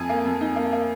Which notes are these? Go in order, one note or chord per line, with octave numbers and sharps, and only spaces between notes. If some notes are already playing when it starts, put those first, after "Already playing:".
Already playing: F2 G#5
A#3
F2
D#4
A#3
A#3